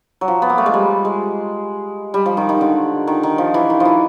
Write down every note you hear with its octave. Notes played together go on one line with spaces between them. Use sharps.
F#3
F3
B3
A#3
A3
G#3
G3
G#3
G3
F3
D#3
D#3
D3
D#3
D#3
F3
E3
D#3
F3
E3